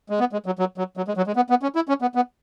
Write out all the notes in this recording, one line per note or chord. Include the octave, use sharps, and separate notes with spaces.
G#3
B3
G#3
F#3
F#3
F#3
F#3
G#3
F#3
G#3
B3
B3
C#4
E4
C#4
B3
B3